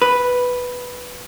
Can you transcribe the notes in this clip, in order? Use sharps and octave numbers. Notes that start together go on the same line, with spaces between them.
B4